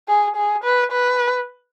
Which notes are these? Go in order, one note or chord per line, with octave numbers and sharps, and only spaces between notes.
G#4
G#4
B4
B4